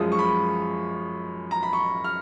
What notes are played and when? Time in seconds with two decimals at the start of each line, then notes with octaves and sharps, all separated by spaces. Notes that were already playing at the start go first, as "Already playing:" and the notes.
Already playing: F#2 F3 G#3 D#6
0.12 C#6
0.19 B5
1.51 A#5
1.63 B5
1.73 C#6
2.04 F6